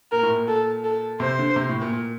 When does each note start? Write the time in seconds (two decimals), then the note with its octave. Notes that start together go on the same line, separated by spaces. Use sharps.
0.12 A#2 A#4
0.23 A2
0.29 A#2
0.48 A4
0.84 A4
1.20 C3 C5
1.39 D3
1.56 C3
1.69 A2
1.82 A#2
1.93 A#2